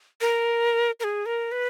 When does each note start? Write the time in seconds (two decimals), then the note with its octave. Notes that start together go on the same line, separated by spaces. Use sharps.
0.21 A#4
1.00 A#4
1.04 G#4
1.26 A#4
1.52 B4